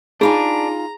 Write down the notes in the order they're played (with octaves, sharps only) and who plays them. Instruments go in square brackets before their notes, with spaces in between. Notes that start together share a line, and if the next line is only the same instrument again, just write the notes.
[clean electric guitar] D4 [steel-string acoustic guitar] D#4 F4 G#5 [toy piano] G#4 B5 [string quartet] A#5